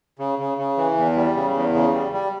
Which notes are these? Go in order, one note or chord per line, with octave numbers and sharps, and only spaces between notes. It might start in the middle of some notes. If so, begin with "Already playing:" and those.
C#3
C#3
C#3
E3
E2
G3
C#3
E2
C#3
G3
G3